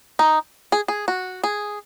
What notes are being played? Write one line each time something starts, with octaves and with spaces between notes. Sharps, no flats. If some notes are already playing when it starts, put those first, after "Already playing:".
D#4
G#4
G#4
F#4
G#4